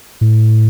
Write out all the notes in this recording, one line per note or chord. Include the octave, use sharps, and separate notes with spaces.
A2